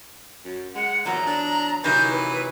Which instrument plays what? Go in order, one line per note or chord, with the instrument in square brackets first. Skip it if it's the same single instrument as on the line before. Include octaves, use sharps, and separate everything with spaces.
[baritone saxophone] F#2
[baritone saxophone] G#3 [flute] F#5
[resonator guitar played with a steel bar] E2 F#3 [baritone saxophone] A#2 [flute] A#5
[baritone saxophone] D4
[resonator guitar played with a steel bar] C3 D#3 F#3 [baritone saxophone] E3 [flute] G6
[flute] B4